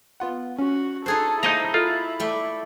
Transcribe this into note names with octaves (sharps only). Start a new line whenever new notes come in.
B3 F4 F#5
C#4 F#4
D#4 G#4 A4 C5 F#6 G#6
A#3 D#4 E4 G#4 C5 D#5 E5 A#5
F4 A4 D#5
A3 D5 G5